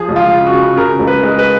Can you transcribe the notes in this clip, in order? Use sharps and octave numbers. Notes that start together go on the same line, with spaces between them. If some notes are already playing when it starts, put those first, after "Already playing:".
Already playing: F3 G#4
C#2
F4
C#3
F#4
C#3
C#3 A#4
C#2
B4
G#3
B4